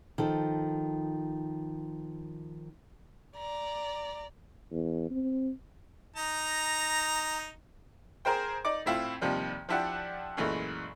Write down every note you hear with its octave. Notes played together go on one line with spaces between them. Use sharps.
D#3 F3 A4
D5 A#5
E2
C4
D#4 A#5
G#4 A#4 C5 G5
D#4 D5 D6
A2 C4 E4 F4
D#2 C3 F3 G3
F3 D4 E4 G4 F#5
F#2 A#2 E3 G#3 A3